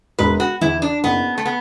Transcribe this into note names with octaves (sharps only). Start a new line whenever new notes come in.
E1 B4
F#4
E2 E3 E4
D4
F#1 B3
A3
B3